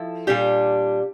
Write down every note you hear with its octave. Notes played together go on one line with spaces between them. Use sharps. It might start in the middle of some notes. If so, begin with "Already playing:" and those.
Already playing: F3 E4 A4
A#2 G3 D4 G4